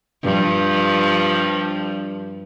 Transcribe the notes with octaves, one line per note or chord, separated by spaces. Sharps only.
G2 F3